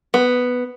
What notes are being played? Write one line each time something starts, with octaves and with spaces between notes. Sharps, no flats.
B3